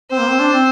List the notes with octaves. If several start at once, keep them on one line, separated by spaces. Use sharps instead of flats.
C4 C5
A#3
C4
D4
C4